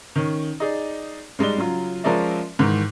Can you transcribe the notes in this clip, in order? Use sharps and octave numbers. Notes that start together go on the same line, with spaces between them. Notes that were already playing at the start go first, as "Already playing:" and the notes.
D#3 C#4
D#4 G#4 D5
G3 G#3 D#4 D5 G7
C#3 F#3 F4
F3 G#3 C#4 A#4 D5 E5
G#2 D#3 E3